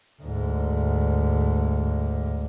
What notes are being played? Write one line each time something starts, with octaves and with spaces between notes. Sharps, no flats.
D2 G#2